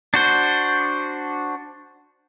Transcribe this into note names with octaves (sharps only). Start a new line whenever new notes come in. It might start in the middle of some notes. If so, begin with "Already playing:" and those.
D4 F#4 C5